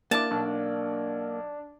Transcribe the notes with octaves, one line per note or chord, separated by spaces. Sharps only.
A#3 D4 E4 A5 D6
B1 D4